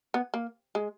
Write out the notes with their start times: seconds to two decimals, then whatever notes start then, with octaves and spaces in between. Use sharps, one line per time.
0.14 B3
0.34 A#3
0.75 G#3